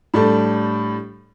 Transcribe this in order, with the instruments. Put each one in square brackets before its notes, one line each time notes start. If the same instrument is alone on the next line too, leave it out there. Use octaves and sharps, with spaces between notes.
[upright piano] A2 G3 D4 A4